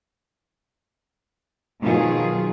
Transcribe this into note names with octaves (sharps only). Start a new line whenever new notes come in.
B2 D#3 F3 F#3 F4 G#4